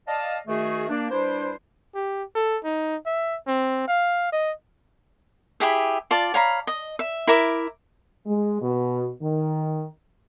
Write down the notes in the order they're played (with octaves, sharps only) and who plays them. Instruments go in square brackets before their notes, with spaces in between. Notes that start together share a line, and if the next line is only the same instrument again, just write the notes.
[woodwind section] D5 D#5 F5 A5
D#3 A3 F#4 G#4
A#3 D4
G2 G3 D4 E4 C5
[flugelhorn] G4
A4
D#4
E5
C4
F5
D#5
[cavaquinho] E4 G4 G#4 E5
F4 D5 A5
C#5 F5 A#5 B5
D#5
E5
E4 A#4 E5 D6
[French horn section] G#3
B2
D#3